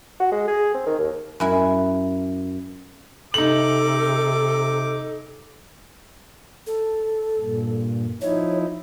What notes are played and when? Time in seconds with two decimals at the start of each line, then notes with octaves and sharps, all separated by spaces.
0.20 F#4
0.32 G#3
0.48 G#4
0.74 C4
0.86 D#3
0.99 D#2
1.40 F#2 E4 G#5
3.34 C3 D#4 A4 D6 F#7
6.67 A4
7.39 G2 A#2
8.21 F3 D#4 E4 C#5